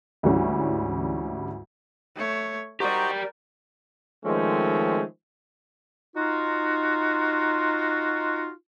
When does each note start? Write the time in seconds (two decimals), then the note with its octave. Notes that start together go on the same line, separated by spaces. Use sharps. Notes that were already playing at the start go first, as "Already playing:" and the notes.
0.23 D2 G#2 E3 G3 C#4
2.16 A3 C#5
2.80 D#4 F#4 G4 A#4 C5 D5
4.25 D#3 F3 G#3 A3 C4 C#4
6.17 D#4 F4 F#4